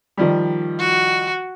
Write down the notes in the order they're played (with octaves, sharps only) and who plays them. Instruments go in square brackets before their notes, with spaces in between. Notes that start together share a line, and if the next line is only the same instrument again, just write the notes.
[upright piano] D#3 F3 G3
[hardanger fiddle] F#4